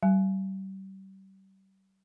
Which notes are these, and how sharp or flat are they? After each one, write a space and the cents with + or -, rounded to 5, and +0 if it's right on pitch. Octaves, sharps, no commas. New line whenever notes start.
G3 -30 G#5 +35